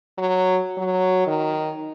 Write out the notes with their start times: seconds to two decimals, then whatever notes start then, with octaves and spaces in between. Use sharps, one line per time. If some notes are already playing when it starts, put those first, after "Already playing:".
0.18 F#3
0.77 F#3
1.27 D#3